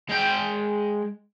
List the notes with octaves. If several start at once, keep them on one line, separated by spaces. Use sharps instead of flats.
G#3 G5